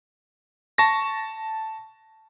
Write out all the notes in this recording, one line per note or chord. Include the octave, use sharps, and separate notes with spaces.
A5 C#6 A#6